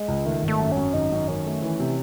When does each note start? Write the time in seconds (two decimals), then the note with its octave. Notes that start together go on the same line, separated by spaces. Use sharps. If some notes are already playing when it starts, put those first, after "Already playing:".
Already playing: G#3
0.08 C#2
0.25 D#3 A3
0.42 G#1
0.48 A3
0.60 F#2
0.72 F#2 C#4
0.94 G#1 D#4
1.11 F#2
1.28 D#3 C#4
1.46 A3
1.62 E3
1.80 C3